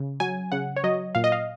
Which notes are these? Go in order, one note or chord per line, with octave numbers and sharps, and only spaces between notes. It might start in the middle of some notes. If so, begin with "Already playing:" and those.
Already playing: C#3
F#3 G#5
C#3 F#5
C#5
F#3 D#5
A#2 F5
D#5
F5